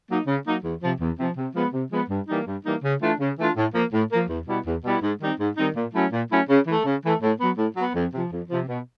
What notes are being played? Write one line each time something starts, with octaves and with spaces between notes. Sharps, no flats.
F#3 A#3 D#4
C#3
F#3 A#3 D#4
E2
C3 F3
E2
C3 F3
C3
F3 G#3 B3
C3
F3 G#3 B3
G2
E3 G3 A#3 D#4
G2
E3 G3 A#3 D#4
C#3
E3 A3 D4 F4
C#3
E3 A3 D4 F4
A2
F3 A#3
A2
F3 A#3
E2
B2 G3 B3 E4
E2
B2 G3 B3 E4
G#2
D#3 G3 C4 D#4
G#2
D#3 G3 C4 D#4
A#2
F#3 A3 C#4 E4
A#2
F#3 A3 C#4 E4
C#3
E3 A3
C#3
E3 A3
A2
F#3 B3
A2
F#3 B3
F2
C3 F3
F2
C3 F3
B2